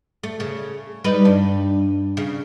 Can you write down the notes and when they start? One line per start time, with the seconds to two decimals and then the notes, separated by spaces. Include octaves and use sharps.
0.23 A3
0.40 C#3
1.04 G3 D#4 B4
1.25 G2
2.17 C#3